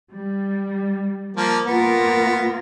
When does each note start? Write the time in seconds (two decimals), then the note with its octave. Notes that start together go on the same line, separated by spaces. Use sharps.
0.11 G3
1.37 F3 A#3
1.67 A#3 B3 F4 A#4